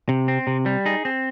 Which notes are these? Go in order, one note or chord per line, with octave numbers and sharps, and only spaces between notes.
C3
C4
C3
G3
D#4 G#4
C4